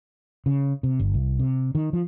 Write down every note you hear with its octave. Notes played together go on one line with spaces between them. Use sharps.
C#3
C3
G1
C2
C3
D#3
F3